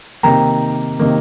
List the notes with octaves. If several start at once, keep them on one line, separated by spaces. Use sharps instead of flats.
C3 D#3 A#3 G5 A#5
C3 D#3 A#3